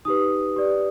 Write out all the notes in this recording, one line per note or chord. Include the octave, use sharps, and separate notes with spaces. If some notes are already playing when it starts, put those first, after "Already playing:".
D#4 G4 B4 D#6
G4 B4 D5